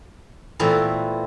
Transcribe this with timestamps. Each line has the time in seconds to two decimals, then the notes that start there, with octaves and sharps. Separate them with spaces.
0.59 A#2 E3 A3 B3 C4